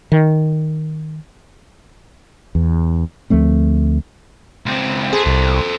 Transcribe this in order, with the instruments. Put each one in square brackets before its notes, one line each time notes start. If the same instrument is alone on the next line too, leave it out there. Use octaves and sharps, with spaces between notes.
[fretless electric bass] D#3
E2
D2 F3 A3 C4
[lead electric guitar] C#2 C4
[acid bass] G#4 [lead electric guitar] A4 C5
[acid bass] C2